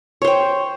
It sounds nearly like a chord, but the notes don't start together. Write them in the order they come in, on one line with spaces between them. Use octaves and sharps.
C#5 C5 G5